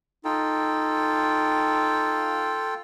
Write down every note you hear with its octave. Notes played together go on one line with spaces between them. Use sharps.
D#4 F4 A4 G5